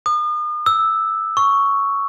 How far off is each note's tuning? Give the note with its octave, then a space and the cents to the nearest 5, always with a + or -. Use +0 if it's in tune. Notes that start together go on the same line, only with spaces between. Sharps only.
D#6 -40
E6 -5
C#6 +5